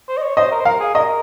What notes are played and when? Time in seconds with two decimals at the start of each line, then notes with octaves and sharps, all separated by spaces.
0.08 C5
0.17 D#5
0.23 C#5
0.37 C5 D#5
0.51 A#4
0.61 C5
0.65 A#4 F5
0.80 G#4
0.95 A#4 D#5